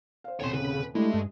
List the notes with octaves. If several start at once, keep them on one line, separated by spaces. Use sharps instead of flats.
C5 F5
D#1 C3 C#5 C6
C#3 B4
G#3 A3 D4 E4 G4
G2